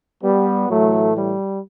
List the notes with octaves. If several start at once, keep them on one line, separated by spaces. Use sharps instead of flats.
G3 B3
A2 E3 F#3 A3
G3